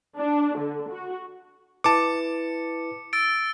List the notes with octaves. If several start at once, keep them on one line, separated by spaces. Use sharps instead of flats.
D4
D3
F#4
E4 B4 A5 D6 C#7
E6 A6 D7